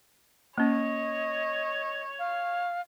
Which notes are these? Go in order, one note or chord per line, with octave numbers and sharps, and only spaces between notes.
A#3 C#4 C#5 D#5
F5